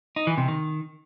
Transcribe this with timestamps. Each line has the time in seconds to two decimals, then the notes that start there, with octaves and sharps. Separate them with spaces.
0.16 D#4
0.27 E3
0.38 C3
0.48 D#3